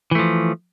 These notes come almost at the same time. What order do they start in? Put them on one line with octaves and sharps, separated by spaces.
E3 A3 F3